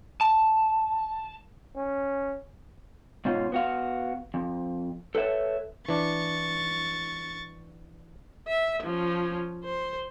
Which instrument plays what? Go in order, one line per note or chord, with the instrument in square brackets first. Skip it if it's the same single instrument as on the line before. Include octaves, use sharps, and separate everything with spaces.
[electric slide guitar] A5
[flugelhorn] C#4
[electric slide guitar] G#2 B2 C#4 F4
B3 F#4 F5
F2
A4 B4 C#5 E5
[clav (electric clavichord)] E3 D4 [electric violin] C#6 A6
[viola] E5
F3 C#4
C5